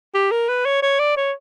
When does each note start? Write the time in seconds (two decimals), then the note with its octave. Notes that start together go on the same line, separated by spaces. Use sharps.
0.15 G4
0.31 A#4
0.48 B4
0.65 C#5
0.82 C#5
0.99 D5
1.17 C#5